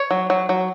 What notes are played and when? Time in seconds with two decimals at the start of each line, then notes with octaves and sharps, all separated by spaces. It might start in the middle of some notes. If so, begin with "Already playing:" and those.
Already playing: C#5
0.11 F#3
0.30 F#3
0.49 F#3